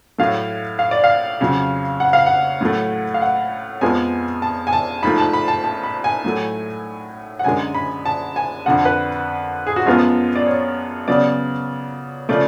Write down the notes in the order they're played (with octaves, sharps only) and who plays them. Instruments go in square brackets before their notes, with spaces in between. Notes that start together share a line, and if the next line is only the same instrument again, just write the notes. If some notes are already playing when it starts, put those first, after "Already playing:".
[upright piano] A2 F#3 A3 F5
F5
D5
F5
F2 C#3 F#3
F#5
F5
F#5
A2 F#3 A3
F5
F#5
F2 F3 G#3 B3 G#5
A5
G#5
A5
G#2 F3 A3 B5
A5
B5
A5
A5
B5
G#5
A2 F#3 A3
F#5
F#2 D3 G#3 G#5
B5
A5
G#5
F2 D3 F3 F#5
B4
G#4
F#4
F#2 F3 G#3 B3 F4
D5
C#5
C#3 F#3 B3 D5
C#3 F3 A3 D5